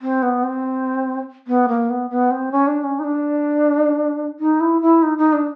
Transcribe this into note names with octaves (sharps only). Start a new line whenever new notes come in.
C4
B3
C4
B3
A#3
B3
B3
C4
C#4
D4
C#4
D#4
D4
D#4
E4
E4
D#4
D#4
D4